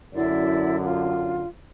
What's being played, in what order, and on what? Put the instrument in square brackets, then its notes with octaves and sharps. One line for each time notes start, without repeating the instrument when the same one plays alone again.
[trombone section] F#2 D3 [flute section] E4 D5
[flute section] F4